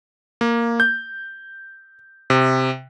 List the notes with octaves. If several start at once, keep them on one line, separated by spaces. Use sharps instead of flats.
A#3
G6
C3